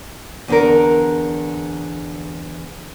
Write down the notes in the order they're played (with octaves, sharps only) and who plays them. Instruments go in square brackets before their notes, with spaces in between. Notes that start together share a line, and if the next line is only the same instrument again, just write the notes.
[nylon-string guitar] E2 D3 A#4